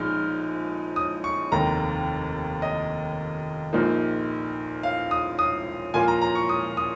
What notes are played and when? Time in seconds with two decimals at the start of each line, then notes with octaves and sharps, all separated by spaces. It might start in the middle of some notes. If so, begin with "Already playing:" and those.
Already playing: A#1 F3 G#3 D#4 F6
0.96 D#6
1.24 C#6
1.52 F1 D#2 D#3 A#5
2.62 D#5
3.73 A#1 A#2 A#3 D#4
4.83 F5
5.11 D#6
5.39 D#6
5.94 A#2 F3 A#3 F4 G#5
6.08 A#5
6.21 A#5
6.35 C#6
6.49 D#6
6.77 D#6